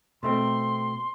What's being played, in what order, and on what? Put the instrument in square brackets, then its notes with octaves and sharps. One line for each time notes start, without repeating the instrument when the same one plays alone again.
[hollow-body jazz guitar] B2 A3 C4 [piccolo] C6